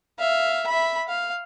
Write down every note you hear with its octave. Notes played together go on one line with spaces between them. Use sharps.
E5 F5
E5 B5
F5